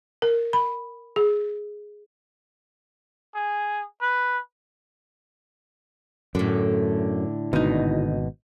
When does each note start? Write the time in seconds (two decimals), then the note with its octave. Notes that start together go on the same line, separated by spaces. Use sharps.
0.22 A#4
0.53 B5
1.16 G#4
3.35 G#4
4.01 B4
6.35 F#2 A2 D3
7.53 G#1 D2 B2 D#4